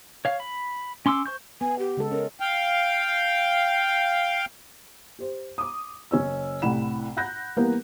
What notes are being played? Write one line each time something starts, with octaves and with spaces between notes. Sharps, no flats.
C#5 F5
B5
C#4 C6 D6 E6
C5 C#6 G6
B3 G#5
G4
C#3 G#3 A4
C#4 A#4
F5 G5
G4 C5
D6 D#6
F#1 C#4 C#5 E6
C2 A2 F#5 B5 E7
F#5 B5 F#6 G6 A#6
E3 G3 A#3 B3 A#4